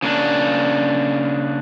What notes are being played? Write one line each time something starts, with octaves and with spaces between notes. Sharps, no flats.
C#3 A#3 D4